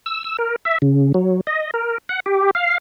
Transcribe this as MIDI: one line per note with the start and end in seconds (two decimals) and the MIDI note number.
0.06 0.23 88
0.24 0.37 88
0.39 0.56 70
0.65 0.78 76
0.82 1.12 49
1.14 1.41 54
1.47 1.71 75
1.74 1.98 70
2.09 2.20 78
2.26 2.51 67
2.55 2.78 77